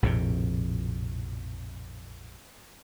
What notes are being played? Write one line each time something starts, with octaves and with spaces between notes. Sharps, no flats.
A#1 F2 A2 C3